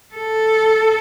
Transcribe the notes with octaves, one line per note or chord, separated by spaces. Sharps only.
A4